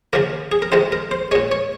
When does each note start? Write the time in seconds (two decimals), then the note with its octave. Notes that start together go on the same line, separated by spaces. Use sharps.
0.13 D#2 C#3 F3 A#3 A#4
0.52 G#4
0.62 A#4
0.72 F2 C3 D#3 G#3 C5
0.92 A#4
1.11 C5
1.31 A#2 G#3 C#5
1.52 C#5